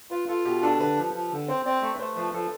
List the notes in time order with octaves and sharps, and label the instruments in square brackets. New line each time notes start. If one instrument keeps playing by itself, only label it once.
[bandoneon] F4 [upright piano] B4
[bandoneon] F4 [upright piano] A4
[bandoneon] B2 [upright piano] G4
[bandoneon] D4 [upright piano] A4
[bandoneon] D3 [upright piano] B4
[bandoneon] F3
F3
D3
[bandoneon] C4 [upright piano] C5
[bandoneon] C4 [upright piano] D5
[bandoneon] A3 [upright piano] E5
[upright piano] B4
[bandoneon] A3 [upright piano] C5
[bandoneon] F3 [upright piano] B4
[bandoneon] F3 [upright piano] A4